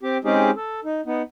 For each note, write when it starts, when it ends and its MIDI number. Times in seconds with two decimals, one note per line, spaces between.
0.03 0.18 60
0.03 0.18 67
0.24 0.51 56
0.24 0.51 60
0.24 0.51 61
0.24 0.51 63
0.24 0.51 67
0.24 0.51 68
0.57 0.80 69
0.85 1.01 63
1.06 1.22 59
1.06 1.22 63